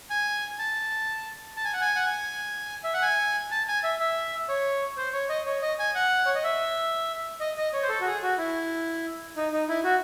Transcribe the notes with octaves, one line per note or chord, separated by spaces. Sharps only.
G#5
A5
A5
G#5
F#5
G#5
F#5
G#5
E5
F#5
G#5
A5
G#5
E5
E5
C#5
C5
C#5
D#5
C#5
D#5
G#5
F#5
C#5
D#5
E5
D#5
D#5
C#5
C5
A4
F#4
G#4
F#4
E4
D#4
D#4
E4
F#4